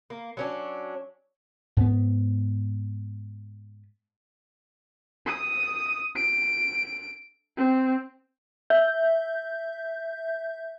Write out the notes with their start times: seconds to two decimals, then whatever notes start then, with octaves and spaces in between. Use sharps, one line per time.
0.10 A#3
0.37 F#3 C#4 D4
1.77 G#2 B3
5.26 D#6
6.16 D7
7.57 C4
8.70 E5 G6